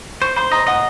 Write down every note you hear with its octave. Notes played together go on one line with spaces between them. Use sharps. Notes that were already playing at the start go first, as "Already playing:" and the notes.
C5 C#6
C5 C6
D#5 A#5
D#5 F#5